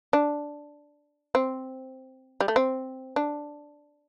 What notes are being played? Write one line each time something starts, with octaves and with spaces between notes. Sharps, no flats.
D4
C4
G3
A3
C4
D4